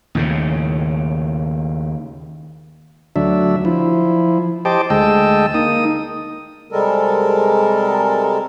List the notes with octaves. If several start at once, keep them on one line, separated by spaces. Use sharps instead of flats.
D#2 A2 C#3
D2 F#3 D4 E5
F3 E4
G4 C5 D#5 G5 A5 D6
D2 G#3 D#5 G5 A5 E6
A#3 D#4 D#6
C3 G3 G#3 A4 A#4